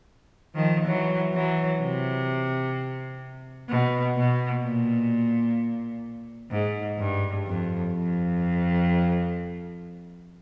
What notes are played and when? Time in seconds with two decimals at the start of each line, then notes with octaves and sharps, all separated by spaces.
0.55 D#3 F3
0.86 E3 F#3
1.33 E3 F#3
1.81 C3
3.69 B2
4.16 B2
4.64 A#2
6.51 G#2
6.98 G2
7.46 F2
7.92 F2